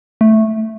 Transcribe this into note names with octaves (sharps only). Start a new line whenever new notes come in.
A3